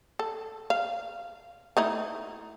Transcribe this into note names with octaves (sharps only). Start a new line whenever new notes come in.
A4
F5
A3 D#4 E4